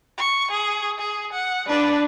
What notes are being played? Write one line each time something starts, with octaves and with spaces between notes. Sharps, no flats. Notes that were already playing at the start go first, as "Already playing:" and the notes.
C#6
G#4
G#4
F#5
D4 B4